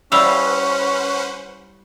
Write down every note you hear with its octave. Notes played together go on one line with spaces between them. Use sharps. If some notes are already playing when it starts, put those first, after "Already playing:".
G3 C#4 E4 B4 C5 F5 F#5 E6